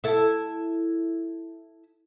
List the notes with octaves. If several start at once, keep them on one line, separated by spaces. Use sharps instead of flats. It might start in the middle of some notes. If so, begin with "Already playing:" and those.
E4 A4